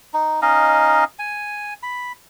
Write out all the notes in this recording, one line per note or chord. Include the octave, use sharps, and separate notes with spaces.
D#4
C#4 D#4 D#5 F5
G#5
B5